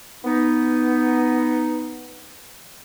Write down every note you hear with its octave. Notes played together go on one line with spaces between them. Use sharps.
B3 D#4